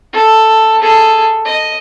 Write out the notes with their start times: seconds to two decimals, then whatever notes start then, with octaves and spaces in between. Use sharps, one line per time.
0.13 A4
0.81 G#4 A4
1.45 D#5